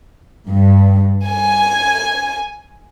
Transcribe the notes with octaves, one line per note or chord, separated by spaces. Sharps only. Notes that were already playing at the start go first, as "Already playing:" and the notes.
G2
G#5